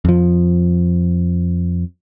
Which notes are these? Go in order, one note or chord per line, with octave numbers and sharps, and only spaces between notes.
F2 F3